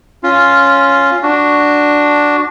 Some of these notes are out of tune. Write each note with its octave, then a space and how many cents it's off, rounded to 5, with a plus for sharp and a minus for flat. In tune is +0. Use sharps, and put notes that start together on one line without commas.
C#4 +5 F4 +0
D4 +0 F#4 +0